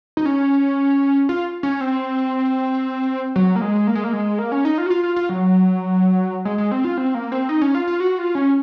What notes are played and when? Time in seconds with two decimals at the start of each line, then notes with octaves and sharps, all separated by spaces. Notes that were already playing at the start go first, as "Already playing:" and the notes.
0.17 D#4
0.25 C#4
1.29 F4
1.63 C#4
1.81 C4
3.36 F#3
3.56 A#3
3.62 G#3
3.87 A#3
3.95 G#3
4.04 A#3
4.13 G#3
4.39 A#3
4.52 C#4
4.65 D#4
4.78 F4
4.86 F#4
4.90 F4
5.03 F4
5.16 F4
5.29 F#3
6.45 G#3
6.58 G#3
6.72 C4
6.85 F4
6.98 C4
7.15 A#3
7.32 C4
7.49 D#4
7.62 C#4
7.75 F4
7.87 F4
8.00 F#4
8.18 F4
8.35 C#4